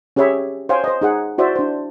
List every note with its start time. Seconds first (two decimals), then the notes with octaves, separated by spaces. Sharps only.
0.16 C#4 G4 G#4 C#5 E5 B5
0.69 C5 C#5 F5 G5 G#5
0.84 C5 D#5
1.01 D#4 G#4 F#5
1.38 E4 F#4 C5 D5 E5
1.56 D4 C5